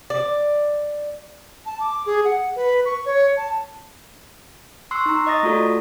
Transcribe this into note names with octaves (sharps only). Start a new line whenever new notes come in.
D5
A5
D6
G#4
F#5
B4
C#6
C#5
A5
C6 C#6 E6 F#6 C7
D#4 A#5
D#5 C#6 D#6 A6 A#6
A3 F4 F#4 A4 D5